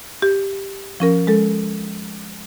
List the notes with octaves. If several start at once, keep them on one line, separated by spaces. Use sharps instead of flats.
G4
F3 C#4 A#4
G#3 A4